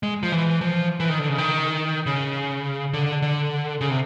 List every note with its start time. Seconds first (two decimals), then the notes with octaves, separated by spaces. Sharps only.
0.03 G#3
0.23 F3
0.32 E3
0.61 F3
1.00 E3
1.09 D#3
1.19 D3
1.29 C#3
1.38 D#3
2.06 C#3
2.93 D3
3.22 D3
3.81 C#3
3.90 C3